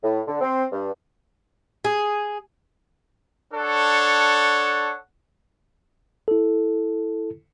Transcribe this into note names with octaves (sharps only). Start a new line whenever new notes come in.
A2
D3
C4
G2
G#4
D4 A4 C#5 F#5
E4 A4